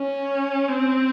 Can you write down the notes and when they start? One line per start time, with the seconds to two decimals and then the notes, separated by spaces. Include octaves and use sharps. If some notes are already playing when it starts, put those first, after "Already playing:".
Already playing: C#4
0.68 C4